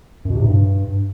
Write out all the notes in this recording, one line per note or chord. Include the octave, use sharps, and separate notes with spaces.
F#2
B2
C3
A2
G2